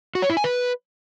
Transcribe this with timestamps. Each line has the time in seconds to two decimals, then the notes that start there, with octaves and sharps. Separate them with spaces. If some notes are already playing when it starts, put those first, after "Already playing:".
0.15 F#4
0.22 C#5
0.30 E4
0.37 G#5
0.44 B4